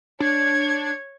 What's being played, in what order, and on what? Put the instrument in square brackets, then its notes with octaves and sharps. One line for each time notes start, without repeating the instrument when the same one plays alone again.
[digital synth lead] D4 [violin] C#5 G#6